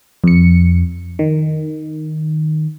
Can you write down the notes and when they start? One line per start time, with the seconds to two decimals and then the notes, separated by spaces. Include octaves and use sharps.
0.24 F2 C#7
1.19 D#3